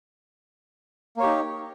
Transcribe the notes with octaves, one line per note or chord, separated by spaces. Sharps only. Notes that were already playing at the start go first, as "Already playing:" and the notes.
A#3 D#4 G4 C#5